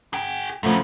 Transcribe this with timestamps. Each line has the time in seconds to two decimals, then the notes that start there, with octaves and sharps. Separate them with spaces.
0.13 G#4 G5
0.63 F#2 C#3 F3 A3